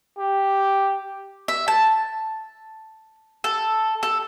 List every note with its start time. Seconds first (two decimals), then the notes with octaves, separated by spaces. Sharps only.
0.19 G4
1.48 E5
1.68 A5
3.44 A4
4.03 A4